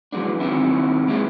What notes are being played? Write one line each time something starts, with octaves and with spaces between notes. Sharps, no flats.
E3 F#3 G#3 B3 D4
D#3 G3 A3 C4 D4 E4
G#3 A#3 B3 E4 G4 G#4